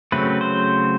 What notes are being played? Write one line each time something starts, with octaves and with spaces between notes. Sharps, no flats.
C#3 F#3 A3 C4 B4
C5